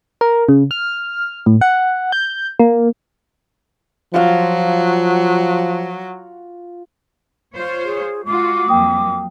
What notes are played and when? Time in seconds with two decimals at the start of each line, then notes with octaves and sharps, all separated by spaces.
0.21 A#4
0.49 C#3
0.71 F6
1.46 A2
1.61 F#5
2.12 G6
2.59 A#3
4.14 F3 F#3 F4 F5
7.54 F4 C5 C#5
7.85 G#4
8.25 G#3 F4 F#4 D6
8.68 F2 F#3 A#3 G5 D#6